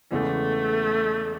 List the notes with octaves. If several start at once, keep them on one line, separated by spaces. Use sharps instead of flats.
E2 C#3 E3 G#3 A3